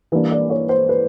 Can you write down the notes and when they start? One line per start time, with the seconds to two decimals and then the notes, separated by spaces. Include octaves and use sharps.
0.12 E3 G3 A#3 D4
0.31 D5
0.50 C#5
0.69 C5
0.89 B4